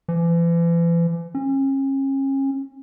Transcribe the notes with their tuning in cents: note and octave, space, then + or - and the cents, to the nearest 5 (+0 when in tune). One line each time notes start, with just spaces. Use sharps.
E3 +40
C#4 -35